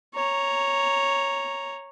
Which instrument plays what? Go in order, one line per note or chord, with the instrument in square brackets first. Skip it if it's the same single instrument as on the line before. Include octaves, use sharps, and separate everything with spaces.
[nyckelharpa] C#5 A#5